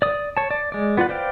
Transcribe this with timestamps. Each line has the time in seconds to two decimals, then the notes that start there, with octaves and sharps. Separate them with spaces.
0.02 D5 D#6
0.37 C#5 A5
0.51 D5
0.72 G#3 D5
0.97 B3 F4 D5 F#5
1.09 B4 C5 D5 F5 G5